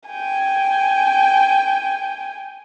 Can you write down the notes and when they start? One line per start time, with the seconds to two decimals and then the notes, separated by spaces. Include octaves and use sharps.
0.10 G5 G#5